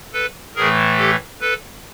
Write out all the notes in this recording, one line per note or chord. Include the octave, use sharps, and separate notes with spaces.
A4 B4
A2 E3 A3 G#4 A#4
G4 A4
A4 B4